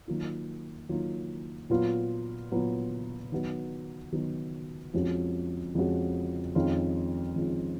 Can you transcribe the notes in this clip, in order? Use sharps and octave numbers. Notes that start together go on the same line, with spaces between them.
D#3 F#3 A#3 F4
D#3 F#3 A#3 F4
A#2 F#3 B3 F4
A#2 F#3 B3 F4
D#3 F#3 B3 F#4
D#3 F#3 B3 F#4
F2 F3 G#3 C#4 F#4
F2 F3 G#3 C#4 F#4
F2 D#3 G#3 C#4 F4
F2 D#3 G#3 C#4 F4